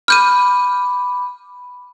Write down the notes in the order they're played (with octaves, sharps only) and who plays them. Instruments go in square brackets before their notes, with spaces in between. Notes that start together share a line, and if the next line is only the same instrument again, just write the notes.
[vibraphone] B5 D6 [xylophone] F6 G6 D#7